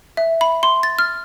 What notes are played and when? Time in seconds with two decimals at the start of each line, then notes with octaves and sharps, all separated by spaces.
0.17 E5
0.41 B5
0.63 C6
0.83 A6
0.99 F6